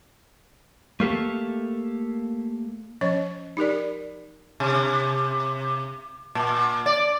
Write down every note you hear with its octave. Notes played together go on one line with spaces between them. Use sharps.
A3 A#3 G4 A4
F3 C#4 C#5 D#5
D#4 G4 A#4 D5
C3
A#2
D5